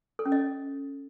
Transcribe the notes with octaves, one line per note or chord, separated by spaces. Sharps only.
A4
C#4
D#5